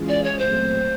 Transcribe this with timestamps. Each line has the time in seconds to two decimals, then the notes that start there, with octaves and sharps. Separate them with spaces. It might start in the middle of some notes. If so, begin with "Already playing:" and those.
Already playing: E3 G#3 C#4 F4 G#4
0.08 D5
0.23 C#5
0.38 A#2 F#3 A3 C4 C5